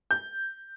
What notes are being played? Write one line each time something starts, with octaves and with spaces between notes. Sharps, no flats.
G6